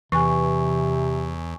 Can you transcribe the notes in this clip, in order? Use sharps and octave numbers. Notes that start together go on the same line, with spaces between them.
E2 C3 E3 G#5 C#6